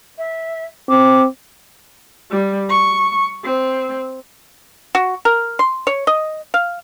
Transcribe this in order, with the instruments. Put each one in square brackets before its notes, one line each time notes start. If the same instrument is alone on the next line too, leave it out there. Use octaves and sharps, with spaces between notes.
[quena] E5
[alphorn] C4 [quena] D6
[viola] G3
C#6
C4
[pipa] F#4
A#4
C6
C#5
D#5
F5